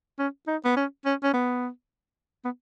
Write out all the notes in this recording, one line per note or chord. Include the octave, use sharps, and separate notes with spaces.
C#4
D#4
B3
C#4
C#4
C#4
B3
B3